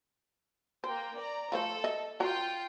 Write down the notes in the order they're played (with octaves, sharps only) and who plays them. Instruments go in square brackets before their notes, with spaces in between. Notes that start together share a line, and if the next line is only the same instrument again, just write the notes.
[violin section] A#3 G5 [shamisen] C5
[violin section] D5 A#5
[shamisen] F3 A3 C5 [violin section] A4
[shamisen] D#5 E5
[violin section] F4 G5 [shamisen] F#4 A#5